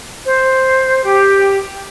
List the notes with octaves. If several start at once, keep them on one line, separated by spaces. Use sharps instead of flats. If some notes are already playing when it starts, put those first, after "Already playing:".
C5
G4